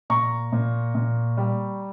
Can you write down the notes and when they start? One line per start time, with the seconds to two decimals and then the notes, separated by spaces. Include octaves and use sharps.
0.10 A#2 A#5 C#6
0.52 A#2
0.95 A#2
1.37 G3